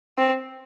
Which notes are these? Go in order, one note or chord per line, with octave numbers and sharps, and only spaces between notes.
C4